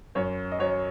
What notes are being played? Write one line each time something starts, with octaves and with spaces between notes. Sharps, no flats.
F#2 C#5
D#5
F#3 C#5